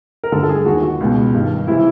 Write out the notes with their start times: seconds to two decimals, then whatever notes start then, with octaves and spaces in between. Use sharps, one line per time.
0.24 A#4
0.32 G2 D3 A4
0.43 A4
0.49 G#4
0.66 D#2 D#3 F#4
0.83 F#4
1.00 C#2 B2
1.34 G2 D#3
1.67 C3 E3 E4